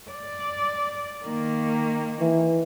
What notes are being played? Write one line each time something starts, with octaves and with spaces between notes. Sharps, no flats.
D5
D#3 A#3
E3